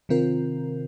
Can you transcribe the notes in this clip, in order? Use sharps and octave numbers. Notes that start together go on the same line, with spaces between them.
C3 D#3 C4 F4 A#4